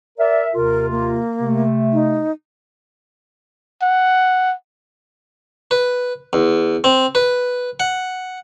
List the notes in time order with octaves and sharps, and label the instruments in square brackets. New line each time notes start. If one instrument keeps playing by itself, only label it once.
[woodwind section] A#4 E5 [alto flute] D5
[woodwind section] D#2 C3 F4 [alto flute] A#4
[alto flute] A#3
[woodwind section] C3 A3
[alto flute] D#4
[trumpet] F#5
[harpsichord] B4
E2
C4
B4
F#5